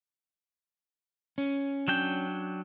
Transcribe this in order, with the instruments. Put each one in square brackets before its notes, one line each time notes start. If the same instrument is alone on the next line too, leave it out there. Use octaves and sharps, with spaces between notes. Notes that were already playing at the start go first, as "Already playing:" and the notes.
[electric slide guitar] C#4
[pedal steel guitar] F#3 D4 G5